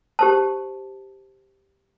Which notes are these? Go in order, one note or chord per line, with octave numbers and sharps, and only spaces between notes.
G4 C5 A5